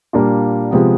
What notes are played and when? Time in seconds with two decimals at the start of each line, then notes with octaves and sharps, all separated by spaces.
0.13 A#2 G3 A#3 D4 F4
0.71 C3 F3 G#3 B3